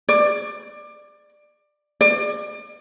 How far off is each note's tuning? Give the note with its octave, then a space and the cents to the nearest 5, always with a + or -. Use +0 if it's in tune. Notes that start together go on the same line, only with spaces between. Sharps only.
D5 +20
D5 +30